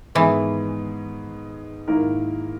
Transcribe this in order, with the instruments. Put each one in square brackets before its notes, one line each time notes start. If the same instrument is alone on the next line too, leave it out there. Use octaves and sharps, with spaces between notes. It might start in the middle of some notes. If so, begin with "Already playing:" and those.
[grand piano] G#2 D#3 G#3 B3 [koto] E3
[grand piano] G#2 D#3 A#3 E4 A#4